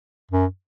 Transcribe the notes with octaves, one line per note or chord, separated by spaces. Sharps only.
F#2